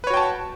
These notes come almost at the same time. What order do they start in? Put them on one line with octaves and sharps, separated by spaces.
B4 C#5 F#4 G5 A5